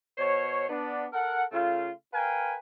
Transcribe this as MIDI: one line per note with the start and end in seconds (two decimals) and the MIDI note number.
0.18 0.66 47
0.18 0.66 72
0.18 0.66 73
0.69 1.06 59
0.69 1.06 62
1.13 1.44 69
1.13 1.44 70
1.13 1.44 78
1.52 1.91 49
1.52 1.91 57
1.52 1.91 65
2.14 2.57 70
2.14 2.57 71
2.14 2.57 77
2.14 2.57 79
2.14 2.57 80